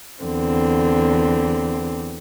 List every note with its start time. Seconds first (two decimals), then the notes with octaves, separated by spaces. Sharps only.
0.24 E2 D3 C4